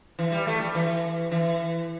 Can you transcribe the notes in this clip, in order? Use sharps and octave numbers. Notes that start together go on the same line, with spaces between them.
E3
G3
A3
G3
E3
E3